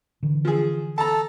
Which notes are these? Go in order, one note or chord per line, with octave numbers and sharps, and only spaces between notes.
D3 E3
F3 G#4
A4 A5 A#5